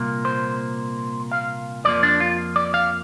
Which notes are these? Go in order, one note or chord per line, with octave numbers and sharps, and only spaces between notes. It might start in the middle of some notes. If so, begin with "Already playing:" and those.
Already playing: C2 A#2 A#3
C5
F5
F2 F3 A#3 D5
D4
F4
D5
F5